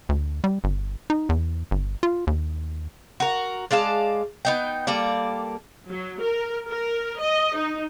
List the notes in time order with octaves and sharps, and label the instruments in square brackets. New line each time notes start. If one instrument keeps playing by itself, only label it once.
[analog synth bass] D2
G3
G1
D#4
E2
G1
F4
D#2
[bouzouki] F#4 A#4
G#3 D5 F5 A5
B3 D#4 G5
G3 A#3 A4 D5
[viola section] F#3
A#4
A#4
D#5
D#4